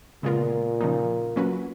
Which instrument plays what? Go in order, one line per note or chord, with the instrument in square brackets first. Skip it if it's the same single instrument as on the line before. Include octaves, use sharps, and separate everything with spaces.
[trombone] A#2 [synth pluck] C#3 G#3 B3 F4 A#4
[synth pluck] C#3 F3 A#3 D#4
F#3 A#3 C#4 F#4 B4